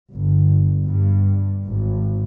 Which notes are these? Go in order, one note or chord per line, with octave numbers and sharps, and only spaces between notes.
G1
G2
G#1